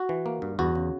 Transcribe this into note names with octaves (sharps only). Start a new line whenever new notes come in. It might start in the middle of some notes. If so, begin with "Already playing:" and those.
Already playing: F#4
E3
A#3
G2
E2 F#4
C#3